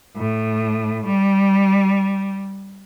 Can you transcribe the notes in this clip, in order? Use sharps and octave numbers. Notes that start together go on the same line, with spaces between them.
A2
G3